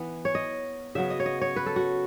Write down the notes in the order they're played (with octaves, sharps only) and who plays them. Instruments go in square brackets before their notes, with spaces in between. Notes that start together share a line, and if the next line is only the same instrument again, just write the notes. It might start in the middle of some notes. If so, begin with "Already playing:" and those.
Already playing: [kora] E3 B3
C#5
D#5
C#3 F#3 B3 E5
D#5
C#5
D#5
C#5
B4
A4
F#4